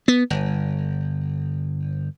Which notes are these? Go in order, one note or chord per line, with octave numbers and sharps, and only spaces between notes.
B3
G1